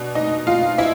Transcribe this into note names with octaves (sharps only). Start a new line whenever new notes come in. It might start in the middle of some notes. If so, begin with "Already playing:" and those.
Already playing: B2 D4
D#4 D#5
F4 F5
E4 E5